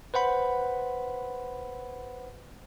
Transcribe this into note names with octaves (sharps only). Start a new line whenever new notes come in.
B4 C5 F#5 B5